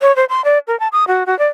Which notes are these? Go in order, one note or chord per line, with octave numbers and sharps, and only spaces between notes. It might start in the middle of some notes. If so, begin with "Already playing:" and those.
C#5
C5
C6
D5
A#4
A5
D#6
F#4
F#4
D5